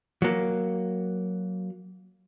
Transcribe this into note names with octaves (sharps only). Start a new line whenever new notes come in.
F#3 A#3